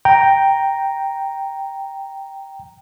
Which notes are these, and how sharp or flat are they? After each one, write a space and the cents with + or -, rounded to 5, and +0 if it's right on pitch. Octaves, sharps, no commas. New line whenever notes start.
G5 +0 A#5 +0